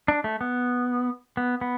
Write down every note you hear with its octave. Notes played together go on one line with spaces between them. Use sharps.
D4
A3
B3
B3
B3